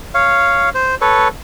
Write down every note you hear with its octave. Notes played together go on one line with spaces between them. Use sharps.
C#5 F5
C5
A4 B4 C#5